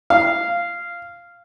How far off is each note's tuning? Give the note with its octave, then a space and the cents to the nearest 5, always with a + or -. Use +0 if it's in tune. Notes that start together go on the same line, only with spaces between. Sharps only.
F5 -10